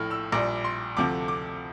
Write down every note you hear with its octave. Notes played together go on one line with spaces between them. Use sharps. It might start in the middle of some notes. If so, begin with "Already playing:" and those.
Already playing: A#1 A2 F3 A3 F6
E6
A#1 A#2 G3 D6
C6
D2 C3 F3 A3 D6
D6